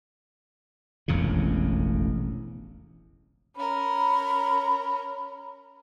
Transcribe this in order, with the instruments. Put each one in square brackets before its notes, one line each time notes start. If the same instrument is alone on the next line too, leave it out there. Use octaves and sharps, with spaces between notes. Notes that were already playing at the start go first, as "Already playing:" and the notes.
[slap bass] E1 A1 F2 C#3
[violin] C#4 A#4 [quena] B5